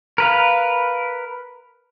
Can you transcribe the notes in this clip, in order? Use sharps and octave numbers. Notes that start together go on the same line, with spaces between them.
A#4 B4 F5